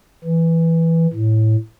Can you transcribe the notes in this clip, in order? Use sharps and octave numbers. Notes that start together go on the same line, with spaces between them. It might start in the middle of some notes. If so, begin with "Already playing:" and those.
E3
A2